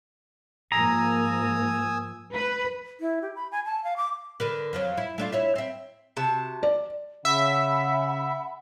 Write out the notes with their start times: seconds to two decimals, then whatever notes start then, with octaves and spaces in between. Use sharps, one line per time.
0.72 G#2 F3 A#3 G#5 A#5 D#6 E6
2.34 B4
3.00 E4
3.22 G4
3.35 B5
3.51 G#5
3.65 A5
3.84 F5
3.97 D6
4.40 D3 A#4 B4
4.73 F2 F3 F#3
4.98 E4
5.18 A3 D4 F4
5.32 E4 C#5 E5
5.56 C4 E5
6.17 C3 F#4 A5
6.63 D5
7.25 C#3 E5 F#5 G#5 B5